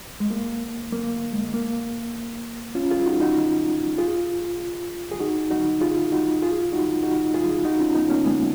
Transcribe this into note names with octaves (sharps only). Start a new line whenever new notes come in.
G#3
A#3
A#3
G#3
A#3
C#4 F4
F4 G#4
D#4 F#4
D#4 F#4
F4 G#4
G#4
D#4 F#4
D#4 F#4
F4 G#4
D#4 F#4
F4 G#4
D#4 F#4
D#4 F#4
F4 G#4
D#4 F#4
C#4 F4
B3 D#4
A#3 C#4
G#3 B3